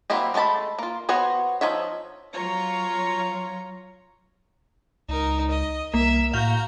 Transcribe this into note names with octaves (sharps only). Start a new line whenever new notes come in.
F#3 A#3 C4 E4 G4
G#3 A3 C#4 A5 B5
A#3 F4
B3 F#4 C5 C#5
F3 D#4 C#5 E5
F#3 F4 C#5 A#5
C#2 D#4 A#4
D#5
C2 A#3 E5 E6
A2 F#4 F5 A#5 G6 G7